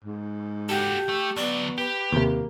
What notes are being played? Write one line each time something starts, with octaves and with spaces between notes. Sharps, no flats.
G#2
F#4 G4 A4
A3
D2 F#3 B3 D5
G4 B4
D#2 C3 A#3